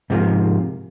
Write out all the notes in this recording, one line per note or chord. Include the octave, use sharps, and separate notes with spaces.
G#2 C3 F3 G3 A#3